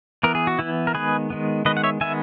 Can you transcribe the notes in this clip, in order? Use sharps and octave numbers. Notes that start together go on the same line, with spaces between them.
E3 B3 A#4
G#4
F#4
E3 B3 E4
A#4
D#3 G#3 B3 G#4 B4
D#3 G#3 B3
D#3 G#3 B3 B4 D#5
F#5
C#5 E5
D#3 G#3 B3 E5 G#5